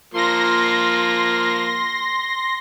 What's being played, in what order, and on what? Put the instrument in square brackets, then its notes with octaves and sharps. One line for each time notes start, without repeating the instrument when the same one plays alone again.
[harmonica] F3 A#3 [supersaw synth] C6 A#6